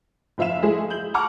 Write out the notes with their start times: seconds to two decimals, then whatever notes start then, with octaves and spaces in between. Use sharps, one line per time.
0.38 F#1 F3 E5 F5 E7
0.62 F3 G#3 A3 E4 G#4
0.90 G6 F#7
1.14 F#5 A5 A#5 C#6 D6 F6